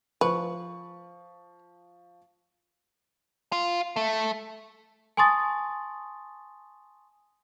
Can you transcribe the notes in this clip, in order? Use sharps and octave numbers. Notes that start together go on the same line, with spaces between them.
F3 B4 C#6
F4
A3
G#5 A5 C6 C#6 D#6 A6